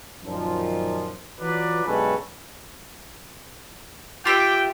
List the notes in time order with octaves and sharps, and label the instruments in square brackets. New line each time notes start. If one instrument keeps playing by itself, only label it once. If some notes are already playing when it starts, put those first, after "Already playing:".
[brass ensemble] F#2 A#2 D#3 F3
E3 F#3 F4 B4 D5
B1 G2 G#3 C#4 A4 B4
[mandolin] F4 G4 E5 [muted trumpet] G5 [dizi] D6